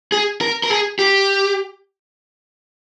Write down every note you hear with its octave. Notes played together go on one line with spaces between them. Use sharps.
G#4
A#4
A#4
G#4
G4